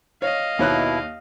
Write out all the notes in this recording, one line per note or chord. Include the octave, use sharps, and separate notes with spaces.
C#5 D#5 F5
D#2 B2 E4 C#5 F#6